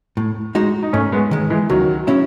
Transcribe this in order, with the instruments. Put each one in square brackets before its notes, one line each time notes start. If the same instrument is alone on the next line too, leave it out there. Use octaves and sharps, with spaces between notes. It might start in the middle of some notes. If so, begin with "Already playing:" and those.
[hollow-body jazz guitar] A2
G#3 D#4 F#4
[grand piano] D#4
[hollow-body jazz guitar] G#2 [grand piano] A3 C#4
[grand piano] G#3 B3
[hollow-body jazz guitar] D#3 G#3
[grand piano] E3 G#3
[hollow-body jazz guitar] C#2 [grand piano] D#3 F#3
[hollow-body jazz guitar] C#3 F#3 C#4 E4